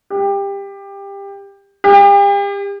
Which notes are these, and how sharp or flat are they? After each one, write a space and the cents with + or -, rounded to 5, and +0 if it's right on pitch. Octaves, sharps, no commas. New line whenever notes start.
G4 +20
G4 +40